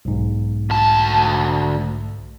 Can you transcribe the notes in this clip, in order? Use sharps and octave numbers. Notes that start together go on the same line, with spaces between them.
B1 G#2
D2 A5